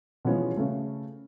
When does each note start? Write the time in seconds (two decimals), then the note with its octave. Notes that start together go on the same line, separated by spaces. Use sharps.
0.25 B2 E3 F3 G#3 B3 C#4
0.57 C#3 A3